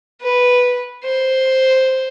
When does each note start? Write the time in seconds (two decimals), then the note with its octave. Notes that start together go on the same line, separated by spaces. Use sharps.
0.21 B4
1.04 C5